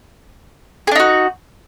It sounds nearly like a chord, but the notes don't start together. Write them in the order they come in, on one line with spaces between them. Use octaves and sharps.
G#4 D4 D#4 F#4